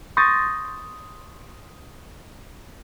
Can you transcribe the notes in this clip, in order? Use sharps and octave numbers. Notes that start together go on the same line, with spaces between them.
C6 C#6 D#6 G6 A6 A#6